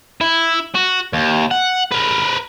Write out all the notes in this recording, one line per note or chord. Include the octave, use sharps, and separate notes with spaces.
E4
F#4
D#2
F#5
A#4 B4